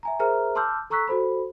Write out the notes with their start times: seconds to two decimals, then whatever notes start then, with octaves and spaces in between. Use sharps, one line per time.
0.03 E5 G#5 A#5
0.19 G#4 A#4 C5 E5 A#5 F6
0.55 A5 C6 D6 E6 F6 G6
0.90 A4 A#5 C#6 E6 F#6 B6
1.08 F#4 A4 C5 B5